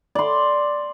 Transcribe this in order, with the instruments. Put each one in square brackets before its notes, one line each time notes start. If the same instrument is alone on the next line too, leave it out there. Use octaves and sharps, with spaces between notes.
[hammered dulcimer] D5 C6